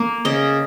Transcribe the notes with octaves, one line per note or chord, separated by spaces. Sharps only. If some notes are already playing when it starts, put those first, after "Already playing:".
Already playing: A#3
C#3 D#5